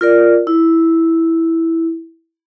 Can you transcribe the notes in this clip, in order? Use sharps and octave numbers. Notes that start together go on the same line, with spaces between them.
F4 A#4 D5
E4